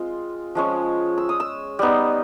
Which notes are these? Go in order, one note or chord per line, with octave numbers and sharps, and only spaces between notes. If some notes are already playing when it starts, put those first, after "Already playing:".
Already playing: G#3 C4 F4
F3 G#3 C#4
E6
D#6
E6
G3 B3 D#4